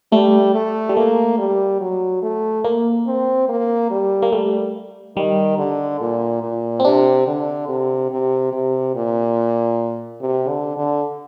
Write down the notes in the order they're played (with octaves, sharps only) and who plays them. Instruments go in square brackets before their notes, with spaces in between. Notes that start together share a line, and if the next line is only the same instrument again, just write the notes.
[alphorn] G3 [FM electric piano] A3
[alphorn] A3
[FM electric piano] G3
[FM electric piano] A3 [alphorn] A#3
[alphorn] G3
F#3
A3
[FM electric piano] A#3
[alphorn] C4
A#3
G3
[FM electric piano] A#3
[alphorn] G3 [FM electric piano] A3
[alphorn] D#3 [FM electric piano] G3
[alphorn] D3
A#2
A#2
[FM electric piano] C4
[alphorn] C3 [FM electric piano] D4
[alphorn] D3
C3
C3
C3
A#2
C3
D3
D3